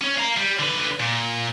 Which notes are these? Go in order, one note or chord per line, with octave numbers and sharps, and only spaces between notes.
C#4 C#5
F5 A#5
G3
D3 B4
A#2